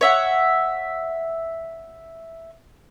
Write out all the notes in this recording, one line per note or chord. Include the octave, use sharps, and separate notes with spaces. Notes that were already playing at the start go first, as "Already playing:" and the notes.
C#5 E5 F#5